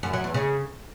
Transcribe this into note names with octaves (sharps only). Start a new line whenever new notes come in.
F#2
F#3
E2
C#3